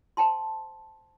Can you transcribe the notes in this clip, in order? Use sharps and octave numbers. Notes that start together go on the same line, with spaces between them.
C5 G5 A5 C6